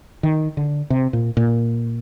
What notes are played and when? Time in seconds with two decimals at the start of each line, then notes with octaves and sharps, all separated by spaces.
0.23 D#3
0.57 D3
0.90 C3
1.13 A#2
1.37 A#2